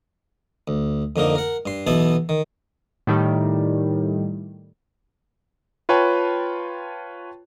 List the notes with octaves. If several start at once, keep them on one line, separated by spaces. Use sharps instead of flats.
D2
F2 D3 A#3 D#4
A#4 F#5
G2 C6
B1 B2 E3 B3 E4 A5
D#3
A2 D#3 G3
F4 B4 C#5 G5 A5